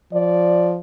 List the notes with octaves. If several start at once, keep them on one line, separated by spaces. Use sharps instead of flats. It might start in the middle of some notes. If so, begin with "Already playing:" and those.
F3 D5